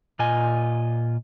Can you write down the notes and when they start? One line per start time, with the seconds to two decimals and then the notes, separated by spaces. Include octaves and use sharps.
0.19 A#2 F4 D#5 G#5